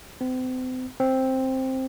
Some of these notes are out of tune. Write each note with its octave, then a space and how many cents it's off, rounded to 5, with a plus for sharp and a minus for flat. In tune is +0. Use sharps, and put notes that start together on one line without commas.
C4 -40
C4 +5